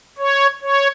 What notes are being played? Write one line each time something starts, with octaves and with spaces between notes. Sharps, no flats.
C#5
C#5